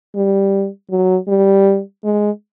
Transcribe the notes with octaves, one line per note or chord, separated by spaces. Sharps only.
G3
F#3
G3
G#3